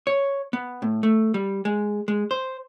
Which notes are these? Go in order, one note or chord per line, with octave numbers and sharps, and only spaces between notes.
C#5
B3
A2
A3
G3
G#3
G#3
C5